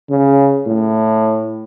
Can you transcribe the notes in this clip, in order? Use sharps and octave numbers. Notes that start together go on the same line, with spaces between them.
C#3
A2